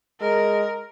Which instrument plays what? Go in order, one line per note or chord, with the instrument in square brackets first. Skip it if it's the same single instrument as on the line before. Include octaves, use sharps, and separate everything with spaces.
[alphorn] G#3 [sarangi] A#4